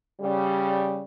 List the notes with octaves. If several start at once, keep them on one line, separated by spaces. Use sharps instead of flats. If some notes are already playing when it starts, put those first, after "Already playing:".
C#3 G3